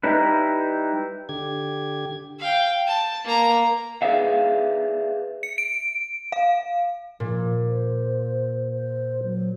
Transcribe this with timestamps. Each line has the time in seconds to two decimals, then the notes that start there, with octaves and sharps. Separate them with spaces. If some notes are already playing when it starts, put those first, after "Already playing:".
0.03 G3 D#4 E4 B4
1.29 D3 G4 G#6
2.39 F5 G5
2.87 A5
3.24 A#3 A#5
4.02 G#4 B4 D5 E5 F5
5.43 C#7
5.58 D7
6.32 F5
7.20 A#2 F3
7.67 C5
8.73 C5
9.24 F#3